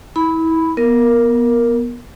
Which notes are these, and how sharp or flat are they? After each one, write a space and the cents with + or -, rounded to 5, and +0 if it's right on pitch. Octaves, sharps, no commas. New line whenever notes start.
E4 -30 B5 +0
B3 -20 A#4 +0